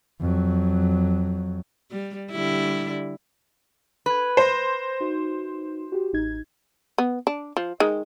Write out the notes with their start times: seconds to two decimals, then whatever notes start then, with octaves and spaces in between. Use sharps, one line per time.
0.21 F2 F#3
1.91 G3
2.31 D3 G3 E4
4.06 B4 B5 G#6
4.37 C5 A#6
5.00 D#4 F#4
5.92 F#4 G4
6.13 A1 D#4 G#6
6.98 B3
7.27 D4
7.57 F3
7.80 D#3 G#3